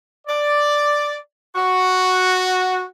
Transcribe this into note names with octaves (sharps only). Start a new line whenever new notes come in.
D5
F#4